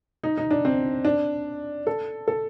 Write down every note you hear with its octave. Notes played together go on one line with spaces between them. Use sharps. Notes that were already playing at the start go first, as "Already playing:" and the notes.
D#4
D#4
D4
C4
D4
A4
A4